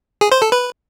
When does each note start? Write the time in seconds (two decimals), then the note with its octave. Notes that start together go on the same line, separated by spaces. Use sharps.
0.21 G#4
0.31 C5
0.42 A4
0.52 B4